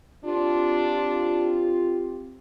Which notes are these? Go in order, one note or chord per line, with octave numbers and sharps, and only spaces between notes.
C4 D4 F4 G4